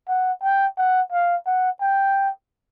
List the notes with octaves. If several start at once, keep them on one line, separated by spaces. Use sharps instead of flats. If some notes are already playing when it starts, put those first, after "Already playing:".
F#5
G5
F#5
F5
F#5
G5